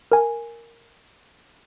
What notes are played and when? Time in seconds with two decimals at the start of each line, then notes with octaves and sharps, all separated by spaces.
0.12 A#4 G#5